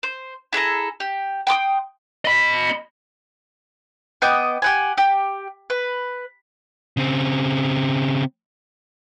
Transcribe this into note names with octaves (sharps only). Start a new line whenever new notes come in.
C5
E4 G#4 A4 A#5
G4
G5 C6 D6 D#6
D#5 B5
B3 D#5 G5 D6
G4 F#5 G#5
G4
B4
C#3 C4